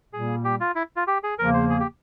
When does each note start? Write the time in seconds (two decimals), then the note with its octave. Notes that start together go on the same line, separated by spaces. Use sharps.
0.13 A#2 G3 A#3 G#4
0.44 G4
0.60 F4
0.75 E4
0.96 F4
1.07 G4
1.23 G#4
1.39 E2 C#3 F3 A#3 A#4
1.54 C5
1.70 G#4
1.80 G4